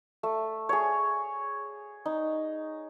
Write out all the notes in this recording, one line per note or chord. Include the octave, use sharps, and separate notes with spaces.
A3
G#4 C#5
D#4